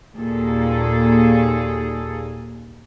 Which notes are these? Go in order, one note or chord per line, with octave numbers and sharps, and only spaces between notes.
D#2 A#2 A#3 G#4 A4